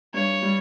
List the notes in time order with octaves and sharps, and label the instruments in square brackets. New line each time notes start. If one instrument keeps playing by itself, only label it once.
[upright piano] G2 [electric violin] C#5
[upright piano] G3